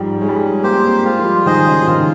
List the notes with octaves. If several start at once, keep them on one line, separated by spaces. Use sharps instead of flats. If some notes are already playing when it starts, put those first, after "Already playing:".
Already playing: G#2 F3 G3
G#3 C#4
G3
G#3
A#3 G4 C5
C4
A#3
G#3 F4
F3
G3
D#3 G#4 C5 D#5
C#3
F3
D#3 F4